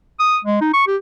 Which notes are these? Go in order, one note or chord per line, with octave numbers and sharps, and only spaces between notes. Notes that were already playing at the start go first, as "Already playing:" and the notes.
D#6
G#3
D#4
C#6
G4